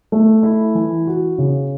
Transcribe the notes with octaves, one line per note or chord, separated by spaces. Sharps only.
A3
E4
E3
F#4
C#3